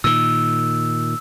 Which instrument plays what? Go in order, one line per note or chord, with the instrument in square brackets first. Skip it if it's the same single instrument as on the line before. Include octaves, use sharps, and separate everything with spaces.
[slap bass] A#2 D#3 [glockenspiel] E6